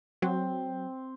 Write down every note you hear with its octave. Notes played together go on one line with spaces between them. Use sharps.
F#3 C4